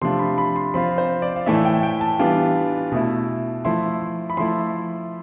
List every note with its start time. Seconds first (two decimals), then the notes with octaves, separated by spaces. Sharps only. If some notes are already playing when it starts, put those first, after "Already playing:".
0.01 C3 F3 A3 D4 F4 C6
0.19 B5
0.38 B5
0.56 C6
0.74 F3 C4 F4 B5
0.98 C5
1.22 D5
1.36 F5
1.46 A2 E3 A3 E4 E5
1.65 G5
1.83 G5
2.01 A5
2.19 E3 G3 B3 D4 F4
2.92 B2 A3 E4
3.65 F3 A3 E4 C6
4.30 B5
4.37 F3 A3 E4 C6